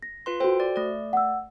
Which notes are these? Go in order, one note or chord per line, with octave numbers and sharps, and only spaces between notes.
A#6
F4 B4 C6
F#4 A4 C5 G5
D5
A3 D5
F#5 E6